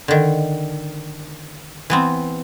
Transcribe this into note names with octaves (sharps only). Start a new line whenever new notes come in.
D3 D#3
E3 B3 C4